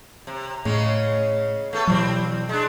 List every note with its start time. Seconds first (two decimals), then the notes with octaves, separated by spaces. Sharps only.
0.27 C3
0.65 A2 C#3 G#3 C#4
1.73 A3 B3 A4
1.87 B2 E3 F#3 G3 C4
2.49 G#3 D4